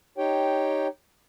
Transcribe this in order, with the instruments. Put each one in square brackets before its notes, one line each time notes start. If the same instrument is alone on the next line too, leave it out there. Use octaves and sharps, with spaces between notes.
[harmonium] D#4 G4 C#5 G5